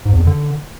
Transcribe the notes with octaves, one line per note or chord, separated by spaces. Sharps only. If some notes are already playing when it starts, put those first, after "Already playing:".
G#2
E2
F2
D3